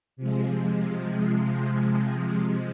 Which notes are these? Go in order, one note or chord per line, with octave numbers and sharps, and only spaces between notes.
C3 F3 G#3